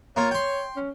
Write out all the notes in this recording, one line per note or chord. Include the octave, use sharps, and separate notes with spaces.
A#3 F4 C#5
G5 C6
C#4